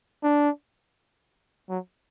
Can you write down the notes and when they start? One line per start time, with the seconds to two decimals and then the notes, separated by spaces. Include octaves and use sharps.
0.23 D4
1.69 F#3